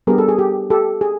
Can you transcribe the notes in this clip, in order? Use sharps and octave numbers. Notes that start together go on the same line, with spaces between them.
G3 B3 D4 G4 G#4 A#4
A4
G#4
G4
G4 A4
G#4